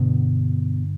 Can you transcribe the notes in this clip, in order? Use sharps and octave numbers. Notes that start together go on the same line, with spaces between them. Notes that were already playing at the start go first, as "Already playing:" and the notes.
Already playing: G2 B2 D3 B3